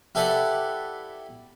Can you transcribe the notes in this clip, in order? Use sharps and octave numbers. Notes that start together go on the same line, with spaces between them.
E4 G4 A4 B4 D5 F#5